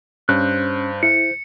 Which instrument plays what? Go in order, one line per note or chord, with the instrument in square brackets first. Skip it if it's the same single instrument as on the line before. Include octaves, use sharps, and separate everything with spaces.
[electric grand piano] G2 [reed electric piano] C#4 [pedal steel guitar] C5 F#6
[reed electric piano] E4 [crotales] C#7